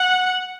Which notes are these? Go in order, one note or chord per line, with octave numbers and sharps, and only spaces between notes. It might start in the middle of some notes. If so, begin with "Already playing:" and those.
Already playing: F#5